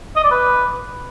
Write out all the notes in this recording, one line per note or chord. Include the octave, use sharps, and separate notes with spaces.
D#5
D5
B4